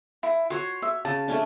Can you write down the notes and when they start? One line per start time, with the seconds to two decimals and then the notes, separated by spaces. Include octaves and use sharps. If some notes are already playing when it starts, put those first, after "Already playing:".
0.23 E4
0.50 F#4 C#5 C6
0.82 E5
1.05 C#3 A5
1.28 A3 C#4 D4